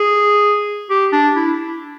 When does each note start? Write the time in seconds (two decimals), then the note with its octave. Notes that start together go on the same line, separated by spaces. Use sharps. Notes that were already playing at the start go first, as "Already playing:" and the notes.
Already playing: G#4
0.90 G4
1.12 D4
1.36 E4